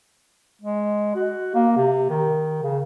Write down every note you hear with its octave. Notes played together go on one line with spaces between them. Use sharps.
G#3
F#4
A#3
C3
D#3
C#3